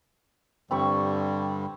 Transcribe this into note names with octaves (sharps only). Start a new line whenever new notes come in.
G2 D3 G3 C4 B5 C#6